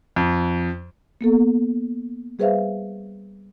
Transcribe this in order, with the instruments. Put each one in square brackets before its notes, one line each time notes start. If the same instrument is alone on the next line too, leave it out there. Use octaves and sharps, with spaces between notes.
[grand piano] F2
[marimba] A#3 B3 A4
G3 G#4 B4 C5 E5 F5